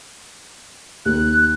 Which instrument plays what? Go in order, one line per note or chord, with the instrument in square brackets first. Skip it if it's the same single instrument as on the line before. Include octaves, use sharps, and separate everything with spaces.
[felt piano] D#2 [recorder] F#6